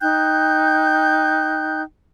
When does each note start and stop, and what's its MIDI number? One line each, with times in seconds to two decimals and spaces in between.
0.01 1.82 63
0.01 1.82 79
0.01 1.82 90
0.01 1.82 91